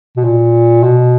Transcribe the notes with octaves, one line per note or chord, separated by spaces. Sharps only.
B2
A#2
B2